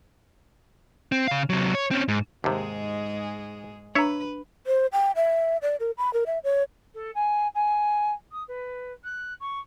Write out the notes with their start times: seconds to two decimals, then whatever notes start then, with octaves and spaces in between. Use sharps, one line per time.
1.12 C4
1.28 C#3 F5
1.50 C3 F#3
1.75 C#5
1.91 C4 C#4
2.08 G#2
2.44 D#2 G#2 C3 G#3 G#4
3.95 D4 B4 C#5 E5 A#5
4.67 C5
4.92 G5
5.16 E5
5.62 D5
5.80 A#4
5.98 B5
6.13 A#4
6.26 E5
6.44 C#5
6.94 A4
7.15 G#5
7.54 G#5
8.31 D#6
8.48 B4
9.04 F#6
9.40 C#6